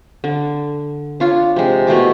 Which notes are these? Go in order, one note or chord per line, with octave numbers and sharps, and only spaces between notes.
D3
D4 F4 C#5
C3 G#3
B2 A3 E4 D6